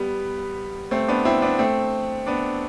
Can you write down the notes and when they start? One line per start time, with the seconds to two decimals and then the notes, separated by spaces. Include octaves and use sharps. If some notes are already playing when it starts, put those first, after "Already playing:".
Already playing: G3 B3
0.91 A3 C4
1.08 B3 D4
1.25 C4 E4
1.42 B3 D4
1.59 A3 C4
2.26 B3 D4